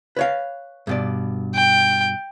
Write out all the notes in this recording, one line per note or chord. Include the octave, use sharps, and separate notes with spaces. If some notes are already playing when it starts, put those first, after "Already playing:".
B4 C#5 F5
G2 B2 D5
G5